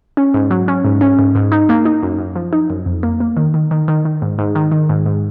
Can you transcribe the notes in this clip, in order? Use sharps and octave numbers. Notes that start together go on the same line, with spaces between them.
C#4
G#2
F#3
C#4
G#2
C#4
G#2
G#2
D#4
A#3
D#4
F#2
F#2
F3
D#4
F#2
F2
A#3
A#3
D#3
D#3
D#3
D#3
D#3
G#2
G#2
D#3
D#3
G#2
G#2